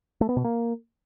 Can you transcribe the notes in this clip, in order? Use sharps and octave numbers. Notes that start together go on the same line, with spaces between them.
A3
B3
B2
A#3